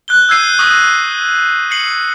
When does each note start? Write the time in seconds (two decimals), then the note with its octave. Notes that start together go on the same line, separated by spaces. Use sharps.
0.08 F#6 G6 G7
0.29 E6 G6 G#6 C7 D#7
0.59 C#6 D#6 F6 A#6 B6 D#7
1.71 C7 C#7 F#7